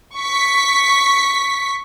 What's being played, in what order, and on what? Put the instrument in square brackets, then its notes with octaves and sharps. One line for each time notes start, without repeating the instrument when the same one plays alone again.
[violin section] C#6 B6